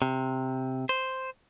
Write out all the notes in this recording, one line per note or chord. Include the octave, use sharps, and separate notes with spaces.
C3
C5